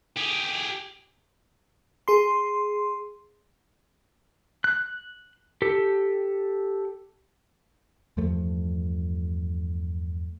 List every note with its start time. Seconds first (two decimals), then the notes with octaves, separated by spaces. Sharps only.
0.16 G4 G#4
2.08 G#4 C6
4.64 F#6
5.62 G4 A4
8.17 E2 G2 F3 A3